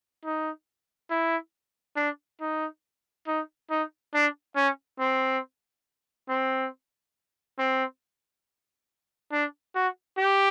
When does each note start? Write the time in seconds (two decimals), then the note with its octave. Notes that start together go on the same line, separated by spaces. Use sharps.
0.25 D#4
1.11 E4
1.96 D4
2.41 D#4
3.27 D#4
3.70 D#4
4.14 D4
4.56 C#4
4.99 C4
6.29 C4
7.59 C4
9.32 D4
9.75 F#4
10.18 G4